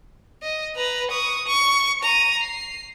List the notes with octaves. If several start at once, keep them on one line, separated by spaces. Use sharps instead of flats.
D#5
B4 A#5
C#6 D#6
C#6
A#5 D#7
C7